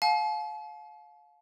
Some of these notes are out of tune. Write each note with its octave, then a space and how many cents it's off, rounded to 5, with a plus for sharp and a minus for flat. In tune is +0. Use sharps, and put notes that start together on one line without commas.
F5 +25 A5 -45